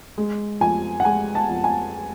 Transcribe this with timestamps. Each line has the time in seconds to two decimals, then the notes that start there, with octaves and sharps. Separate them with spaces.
0.18 G#3
0.61 F2 G#5
1.00 F#5
1.05 G#3 G#5
1.35 A5
1.49 F2
1.64 G#5